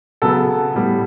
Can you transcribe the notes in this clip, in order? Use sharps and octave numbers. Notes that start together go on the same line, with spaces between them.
C#3 F#3 B3 A4
A2 G3 B3